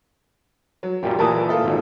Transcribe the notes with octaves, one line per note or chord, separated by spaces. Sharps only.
F#3
F#2 A#2 G3 G4
A#2 E3 A3 A#4 A5 D#6
F4 A4 E5
G#1 G#2